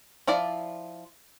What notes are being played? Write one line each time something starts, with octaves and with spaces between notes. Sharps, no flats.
F3 E4 F4 D5